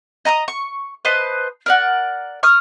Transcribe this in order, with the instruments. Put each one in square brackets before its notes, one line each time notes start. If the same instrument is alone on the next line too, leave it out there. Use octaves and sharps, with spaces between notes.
[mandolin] D#5 A#5 D6 D#6
C#6
B4 C5 D#5 A5
A#4 D5 F#5
C#6 D#6 F6